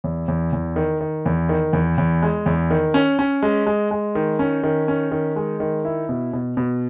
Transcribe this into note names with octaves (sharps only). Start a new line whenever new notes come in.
E2
E2
E2
D#3
D#3
E2
D#3
E2
E2
G#3
E2
D#3
C#4
C#4
G#3
G#3
G#3
D#3
C#4
D#3
C#4
D#3
G#3
D#3
E4
B2
B2
B2